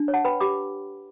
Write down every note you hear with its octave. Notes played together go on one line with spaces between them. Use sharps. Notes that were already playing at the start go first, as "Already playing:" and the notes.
Already playing: D4
C#5
F#5 A5
B4 G5 B5
G4 B5 D6